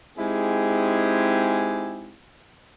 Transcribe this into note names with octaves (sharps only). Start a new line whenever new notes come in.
G#3 C4 D#4 E4 G4 G#4